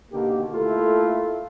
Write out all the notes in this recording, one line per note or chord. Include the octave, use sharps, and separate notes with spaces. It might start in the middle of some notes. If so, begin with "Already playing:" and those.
B2 D3 D#3 A#3 G4
A3 A#3 E4 F4 A4